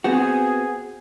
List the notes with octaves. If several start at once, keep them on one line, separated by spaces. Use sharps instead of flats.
B3 C4 F#4 G#4